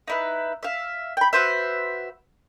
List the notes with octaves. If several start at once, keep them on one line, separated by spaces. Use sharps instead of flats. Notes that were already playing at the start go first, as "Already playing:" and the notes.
D#4 E4 B4
E5 F5
G5 B5
F#4 B4 C5 E5